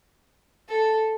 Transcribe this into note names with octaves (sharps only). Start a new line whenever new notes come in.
A4